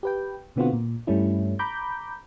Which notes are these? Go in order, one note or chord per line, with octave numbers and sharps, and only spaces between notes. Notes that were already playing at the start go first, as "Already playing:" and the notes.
G4 B4 G5
B2 D3 B3 C4 F4 F#4
A#2
G2 G3 A3 C#4 E4
A#5 B5 D6 G6